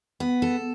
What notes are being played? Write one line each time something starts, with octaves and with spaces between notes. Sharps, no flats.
B3
A4